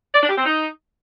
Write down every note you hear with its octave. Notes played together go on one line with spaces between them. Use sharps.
D5
D4
G4
C4
D#4